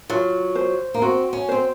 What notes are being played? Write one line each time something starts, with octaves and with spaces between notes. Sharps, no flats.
F#3 F4
C5
A#3
C4 F#4
C#4
C4 C5